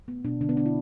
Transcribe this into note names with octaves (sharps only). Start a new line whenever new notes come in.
A3 B3
B2 D4
D3 D4
B3
D3 D4
E4